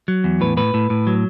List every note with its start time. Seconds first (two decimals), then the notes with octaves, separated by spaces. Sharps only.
0.08 F#3
0.24 E2
0.41 A2 B4
0.57 A2 B4
0.74 A2
0.90 A2
1.07 F#3